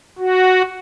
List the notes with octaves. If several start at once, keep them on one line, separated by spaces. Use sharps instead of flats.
F#4